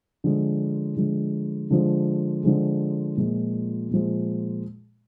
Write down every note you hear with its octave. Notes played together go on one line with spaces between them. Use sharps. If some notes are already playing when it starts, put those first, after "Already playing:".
D3 F3 G#3
D3 F3 G#3
D3 F3 G#3
D3 F3 G#3
A#2 F3 G#3
A#2 F3 G#3